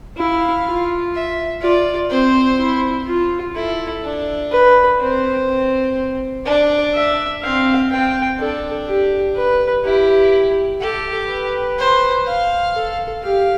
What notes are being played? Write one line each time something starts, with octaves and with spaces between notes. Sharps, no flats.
E4 F5
F4
E5
F4 D5
C4 C5
E4
F4
E4 A4
D4
B4
C4 C5
C4
D4 D5
E5
C4 F5
C4 G5
D4 A4
G4
B4
E4 G4
G4 A4
B4
C5
F5
A4
G4 F5